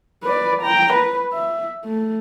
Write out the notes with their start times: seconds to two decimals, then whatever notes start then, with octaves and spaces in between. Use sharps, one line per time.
0.23 B4 D5
0.62 G5 A#5
0.94 B4
1.33 E5
1.85 A3